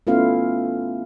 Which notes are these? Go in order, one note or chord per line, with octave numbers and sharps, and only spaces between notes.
A3 B3 C#4 E4 F4 F5